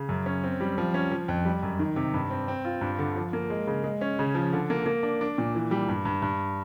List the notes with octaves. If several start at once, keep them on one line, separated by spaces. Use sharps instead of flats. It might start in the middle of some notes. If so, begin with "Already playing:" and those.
Already playing: C#3
F#2
C#4
C4
G3
F3
C#4
F3
F2
G3
F#2
D#3
C3
G2
C4
C4
F4
G2
D3
F3
A#3
G#3
C#3
G#3
C#4
C#3
F3
D3
A#3
A#3
D4
D4
A#2
E3
G3
G2
G2
G2